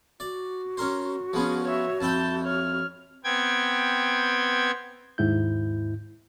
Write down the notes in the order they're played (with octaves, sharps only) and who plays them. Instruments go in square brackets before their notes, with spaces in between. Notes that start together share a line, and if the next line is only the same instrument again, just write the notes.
[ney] F#4 [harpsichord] D5
[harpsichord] C#4 A#4 C5
[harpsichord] F3 B3 C#4 [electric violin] G#4
[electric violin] C#5 E5
[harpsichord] F2 E4 G5 [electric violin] A5 G6
[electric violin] C#5 F6
[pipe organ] B3 C4 G5 G#6
[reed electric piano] D#2 G#2 E4 G6